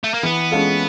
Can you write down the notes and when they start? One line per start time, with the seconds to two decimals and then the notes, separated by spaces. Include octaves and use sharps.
0.04 A3
0.14 A#3
0.23 E3 B3
0.51 G#3 C#4 F4 A4